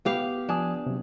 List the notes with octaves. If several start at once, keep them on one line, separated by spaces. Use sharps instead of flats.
B3 G4 F5
F3 D4 G#5 D#6
C3 F#3